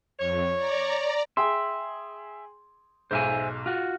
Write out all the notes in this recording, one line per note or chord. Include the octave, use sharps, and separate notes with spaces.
F2 C#5
D5 A#5
G#4 E5 G5 C6
B1 G#2 C5 E5 G#5
F4 F#4